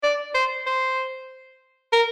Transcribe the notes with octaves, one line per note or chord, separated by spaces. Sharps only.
D5
C5
C5
A#4